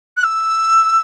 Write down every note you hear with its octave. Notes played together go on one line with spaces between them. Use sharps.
F#6
E6